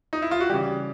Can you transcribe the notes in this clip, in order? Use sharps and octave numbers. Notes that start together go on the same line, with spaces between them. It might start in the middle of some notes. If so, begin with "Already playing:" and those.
D#4
E4
F4
F#4
C#3 E3 G3 G4